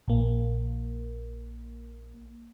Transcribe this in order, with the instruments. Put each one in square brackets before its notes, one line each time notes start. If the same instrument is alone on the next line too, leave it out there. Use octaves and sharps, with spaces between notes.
[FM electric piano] A#1 A#3